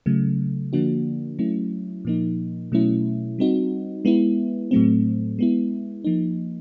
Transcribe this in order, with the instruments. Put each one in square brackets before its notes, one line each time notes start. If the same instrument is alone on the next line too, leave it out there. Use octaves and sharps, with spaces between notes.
[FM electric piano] C#3 F#3 A3
D3 F3 A#3 D4 F#4
F#3 A3 C#4 E4
A#2 F3 A#3 D#4
B2 F#3 A3 C#4 E4
G3 C4 D#4 F#4
G#3 B3 E4
A2 F#3 A3 C4
G#3 B3 E4
F3 A#3 D#4